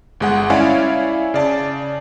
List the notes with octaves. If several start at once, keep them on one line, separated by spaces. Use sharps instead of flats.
G1 G#3 F#5
C#4 E4 C#5 D5 F5 G#5
C#3 D5 A5